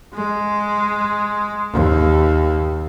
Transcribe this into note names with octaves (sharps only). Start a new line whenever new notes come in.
G#3
D#2